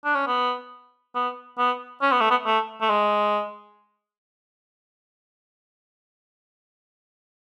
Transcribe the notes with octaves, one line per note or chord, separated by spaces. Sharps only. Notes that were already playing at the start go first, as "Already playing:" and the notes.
D4
C#4
B3
B3
B3
C#4
B3
A3
B3
A3
A3
G#3